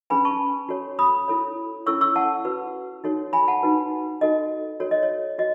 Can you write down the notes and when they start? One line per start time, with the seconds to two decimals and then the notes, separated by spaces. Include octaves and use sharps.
0.10 C#4 G#4 B4 G#5 B5
0.25 A5 C#6
0.69 F#4 A4 C#5
0.99 B5 D#6
1.28 E4 A4 C#5
1.86 C#4 E4 A4 C#5 C#6 E6
2.01 C#6 E6
2.16 F#5 A5
2.45 F#4 B4
3.04 D#4 F#4 A4 C#5
3.33 G#5 B5
3.48 F#5 A5
3.63 D#4 F#4 B4
4.21 D#4 F#4 A4 D#5
4.80 F#4 A4 C#5
4.91 D#5
5.03 C#5
5.38 F#4 D#5